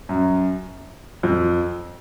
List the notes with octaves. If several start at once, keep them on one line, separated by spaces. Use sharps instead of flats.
F#2
F2